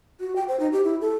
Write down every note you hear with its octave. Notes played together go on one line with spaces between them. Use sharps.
F#4
G5
C5
D#4
G4
E4
A4